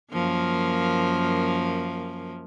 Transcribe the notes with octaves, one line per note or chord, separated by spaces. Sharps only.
F#2 F3 A#3